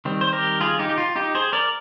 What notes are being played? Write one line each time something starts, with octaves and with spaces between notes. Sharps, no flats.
D#3 G3 C4
C5
G4 A#4
F4 G#4
D#4 G4
G4
F4
D#4 G4
G#4 C5
A#4 D5